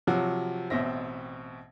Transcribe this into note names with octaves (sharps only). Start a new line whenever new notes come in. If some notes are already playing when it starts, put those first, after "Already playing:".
C3 F3 F#3 F#4
A1 B2 C4 E5 A#6